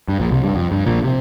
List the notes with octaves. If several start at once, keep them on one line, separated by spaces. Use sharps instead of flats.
G2
A#1 A#2
C2 C3
G2
F2
G2
A#1 A#2
C3